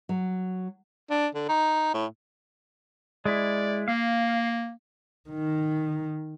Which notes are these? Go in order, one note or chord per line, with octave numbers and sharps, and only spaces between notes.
F#3
D4
D3
D#4
A2
G#3 E4 D5
A#3 F5
D#3